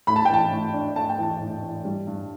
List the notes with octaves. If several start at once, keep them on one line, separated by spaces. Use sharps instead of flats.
A2 B5
A5
G5
E3 A5
A2
D4
A3 A5
G5
E3 A5
A2
E3
G3
G2